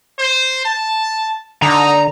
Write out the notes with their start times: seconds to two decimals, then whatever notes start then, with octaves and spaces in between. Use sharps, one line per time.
0.18 C5
0.65 A5
1.62 D3 D#4 A#5